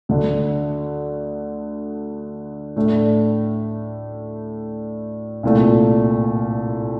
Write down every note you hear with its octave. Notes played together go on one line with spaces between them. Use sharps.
D2 D3 A3
A2 A3 D4
C2 A#2 A3